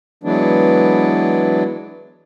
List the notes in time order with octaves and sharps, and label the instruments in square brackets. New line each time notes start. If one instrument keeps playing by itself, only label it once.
[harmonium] E3 F#3 G#3 B3 D4